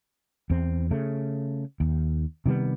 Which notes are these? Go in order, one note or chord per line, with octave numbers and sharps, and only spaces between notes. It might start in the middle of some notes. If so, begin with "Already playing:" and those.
E2 C4
C#3 A3
D#2
C3 D#3 G3 B3